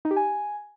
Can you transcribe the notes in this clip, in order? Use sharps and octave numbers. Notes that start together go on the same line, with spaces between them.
D#4
G4
G#5